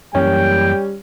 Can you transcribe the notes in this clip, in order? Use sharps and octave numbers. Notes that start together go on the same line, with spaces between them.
F#2 E3 G3 A#3 C#4 G5